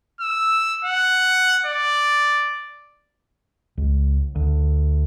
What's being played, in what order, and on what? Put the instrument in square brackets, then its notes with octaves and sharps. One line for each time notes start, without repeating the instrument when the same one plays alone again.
[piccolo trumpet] E6
F#5
D5
[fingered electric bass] C#2
D2